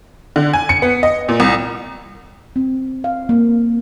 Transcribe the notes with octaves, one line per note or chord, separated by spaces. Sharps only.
D3
G#5
C#7
B3
D#5
A#2
C2
C4
F5
A#3